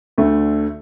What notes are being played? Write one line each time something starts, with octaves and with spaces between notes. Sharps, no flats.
D2 D3 A3